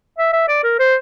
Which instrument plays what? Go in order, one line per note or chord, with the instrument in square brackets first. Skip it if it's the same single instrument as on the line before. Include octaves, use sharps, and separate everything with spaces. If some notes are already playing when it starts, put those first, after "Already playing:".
[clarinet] E5
E5
D5
A#4
C5